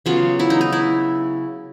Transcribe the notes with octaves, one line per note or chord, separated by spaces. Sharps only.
C#3 F#3 B3 F4
E4
D#4
D#4
E4